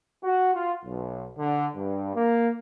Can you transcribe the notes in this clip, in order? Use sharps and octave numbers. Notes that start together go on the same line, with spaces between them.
F#4
F4
B1
D3
G2
A#3